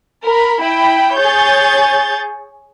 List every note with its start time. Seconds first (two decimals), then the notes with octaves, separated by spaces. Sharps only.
0.25 A#4 B5
0.61 E4 G5 B5
1.19 G#4 C#5 G6 A6